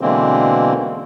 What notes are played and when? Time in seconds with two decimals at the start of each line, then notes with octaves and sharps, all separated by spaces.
0.01 B2 D3 E3 G#3 A#3 C4